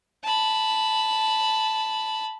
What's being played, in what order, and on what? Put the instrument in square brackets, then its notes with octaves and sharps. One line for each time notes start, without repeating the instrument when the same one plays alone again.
[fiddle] A5 B5